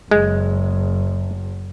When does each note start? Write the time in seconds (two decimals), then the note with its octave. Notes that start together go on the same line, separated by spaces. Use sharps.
0.11 F#1 G#3